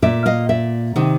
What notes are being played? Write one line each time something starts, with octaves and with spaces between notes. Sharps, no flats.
A#2 D5 E5
D#5 F5
D5 E5
C3 D#3